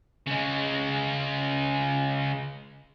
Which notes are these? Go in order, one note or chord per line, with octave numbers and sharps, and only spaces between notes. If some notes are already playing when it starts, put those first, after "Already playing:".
C#3 G#3